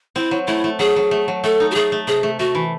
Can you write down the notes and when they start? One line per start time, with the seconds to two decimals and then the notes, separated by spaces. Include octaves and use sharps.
0.16 C4 E4
0.31 F#3
0.47 A3 E4
0.64 A3
0.79 F#3 G#4
0.96 F#3
1.11 A3
1.28 F#3
1.44 A3 A4
1.60 D#4
1.71 F#4
1.75 A3 G#4
1.92 A3
2.07 C3 G#4
2.23 A3
2.39 A3 F#4
2.55 E3